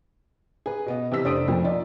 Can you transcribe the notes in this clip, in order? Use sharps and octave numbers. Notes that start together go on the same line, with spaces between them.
G#4 B4
B2 B3 D#5
C3 E3 B3 E6 B6
F1 D4 C5 C6 D#6 D7
F2 A#2 F3
D#4 F4 D5